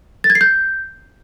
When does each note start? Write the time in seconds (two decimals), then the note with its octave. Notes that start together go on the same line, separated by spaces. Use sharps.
0.24 A6
0.30 G#6
0.35 C7
0.41 G6